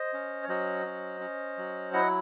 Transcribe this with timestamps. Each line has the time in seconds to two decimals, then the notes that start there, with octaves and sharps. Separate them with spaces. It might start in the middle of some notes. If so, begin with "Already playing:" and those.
Already playing: C5 D#5
0.13 C#4
0.43 C#5
0.48 F#3 C5 D#5
0.86 C#4
1.21 C#4
1.58 F#3
1.93 E4 D#5 F#5